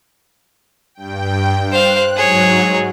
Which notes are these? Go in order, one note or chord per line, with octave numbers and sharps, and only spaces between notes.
G2 G5
C5 F5 F#6
G#2 F#3 G#4 C#5